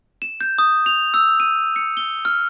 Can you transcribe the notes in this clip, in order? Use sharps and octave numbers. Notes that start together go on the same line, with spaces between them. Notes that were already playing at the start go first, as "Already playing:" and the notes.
E7
G6
D#6
F7
E6
D#7
C#7
G7
F6